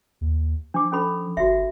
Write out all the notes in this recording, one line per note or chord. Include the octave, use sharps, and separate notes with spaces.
D#2
F3 D4 D6
C#4 A4 B5
G1 F#4 E5